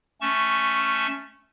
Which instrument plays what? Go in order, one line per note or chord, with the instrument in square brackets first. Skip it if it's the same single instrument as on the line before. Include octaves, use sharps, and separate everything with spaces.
[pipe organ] A3 C#4 A5 C#6